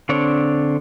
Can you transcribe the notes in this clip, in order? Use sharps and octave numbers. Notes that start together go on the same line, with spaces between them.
D3 C4 D4 C#5